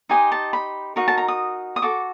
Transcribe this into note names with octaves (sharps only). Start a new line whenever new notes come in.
D#4 G4 C5 D#5 G#5
A5
B5
D#4 F#4 A#4 D#5
A5
A#5
D#6
D#6
F#4 A4 D6